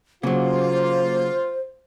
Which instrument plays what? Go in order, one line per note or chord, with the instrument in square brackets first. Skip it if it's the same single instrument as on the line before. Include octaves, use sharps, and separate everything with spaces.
[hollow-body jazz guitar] C#3 F#3 [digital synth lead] A#3 [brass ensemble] F4 [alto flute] C5